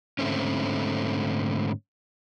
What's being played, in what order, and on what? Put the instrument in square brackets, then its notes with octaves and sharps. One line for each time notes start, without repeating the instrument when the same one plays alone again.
[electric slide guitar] G#2 D3 A3 C4 C#4